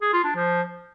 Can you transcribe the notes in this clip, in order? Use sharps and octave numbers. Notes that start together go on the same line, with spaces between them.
G#4
F4
D4
F3